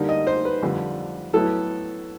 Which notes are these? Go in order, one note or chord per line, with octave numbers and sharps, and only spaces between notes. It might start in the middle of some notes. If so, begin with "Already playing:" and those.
Already playing: D3 G3 A#3 D#4
D#5
C5
B4
F2 D3 G3
A2 F#3 B3 E4 A4